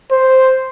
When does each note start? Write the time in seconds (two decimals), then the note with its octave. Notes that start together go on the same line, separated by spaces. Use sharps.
0.12 C5